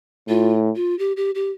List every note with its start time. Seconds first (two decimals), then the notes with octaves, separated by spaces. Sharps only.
0.28 A2 F4
0.76 F4
0.99 G4
1.17 G4
1.35 G4